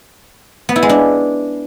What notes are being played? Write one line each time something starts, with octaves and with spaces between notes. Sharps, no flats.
B3
E4
G#3
D4